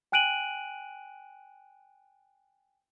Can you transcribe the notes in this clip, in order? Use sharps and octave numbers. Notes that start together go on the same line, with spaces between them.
G5 G#5 F#6 D7 D#7 F#7